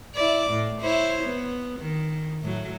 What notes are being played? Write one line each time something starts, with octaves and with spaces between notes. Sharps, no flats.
E4 D5
A2
E4 C5 C#5
B3
D#3
A2 F#3